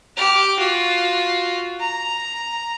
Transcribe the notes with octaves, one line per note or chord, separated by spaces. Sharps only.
G4 F6
F4 F#4
A#5